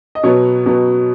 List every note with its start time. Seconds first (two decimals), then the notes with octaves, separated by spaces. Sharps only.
0.15 D#5
0.23 B2 F#3 B3 C#5
0.66 B2 F#3 B3